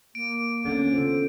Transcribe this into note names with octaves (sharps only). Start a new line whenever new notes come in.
A#3 D7
D3 D#3 B3 C#4
C#3 F4 A4 C5